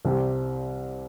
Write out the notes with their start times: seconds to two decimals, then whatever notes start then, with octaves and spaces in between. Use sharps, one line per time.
0.05 C2 C3 G3 C4 G4